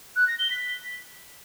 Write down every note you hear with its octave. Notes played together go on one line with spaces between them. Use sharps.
F#6
A#6
G7
B6